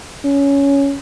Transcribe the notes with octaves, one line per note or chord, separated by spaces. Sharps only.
C#4